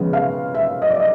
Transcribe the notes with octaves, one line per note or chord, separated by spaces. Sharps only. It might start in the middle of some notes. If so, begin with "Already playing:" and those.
Already playing: C#3 F3 G#3 B3
F5
E5
D#5
D5
D#5